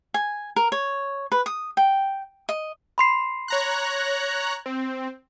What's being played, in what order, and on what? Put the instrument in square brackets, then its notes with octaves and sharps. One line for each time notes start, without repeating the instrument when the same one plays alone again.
[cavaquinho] G#5
A#4
C#5
B4
D#6
G5
D#5
[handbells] B5 C6 C7
[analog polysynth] C#5 A#5 F#6
C4